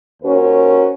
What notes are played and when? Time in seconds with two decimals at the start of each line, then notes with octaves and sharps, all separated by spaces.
0.23 D#2 C#4 F#4 A#4 C5